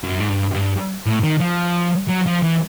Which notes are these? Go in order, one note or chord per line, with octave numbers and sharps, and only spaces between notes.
F#2
G#2
G2
G2
A2
D#3
F3
F#3
F3
E3